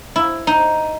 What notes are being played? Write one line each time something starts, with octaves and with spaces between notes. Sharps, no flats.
E4
D#4